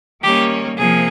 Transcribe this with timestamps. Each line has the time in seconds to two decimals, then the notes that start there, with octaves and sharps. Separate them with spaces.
0.23 D#3 G3 A#3 C#4 G4
0.77 C3 F3 A#3 G#4